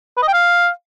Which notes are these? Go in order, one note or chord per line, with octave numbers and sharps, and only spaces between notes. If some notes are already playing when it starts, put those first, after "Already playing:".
B4
D#5
G5
F5